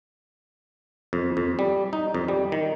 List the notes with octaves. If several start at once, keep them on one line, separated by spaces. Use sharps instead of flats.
F2
F2
G3
D#4
F2
G3
D#3